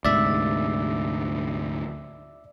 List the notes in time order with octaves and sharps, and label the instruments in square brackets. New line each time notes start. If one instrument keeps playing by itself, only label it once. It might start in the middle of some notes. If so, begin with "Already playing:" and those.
[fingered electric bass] D2 G#2 C3 [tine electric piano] D5 E5